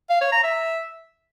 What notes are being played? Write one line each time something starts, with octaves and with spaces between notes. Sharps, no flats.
F5
C#5
A#5
E5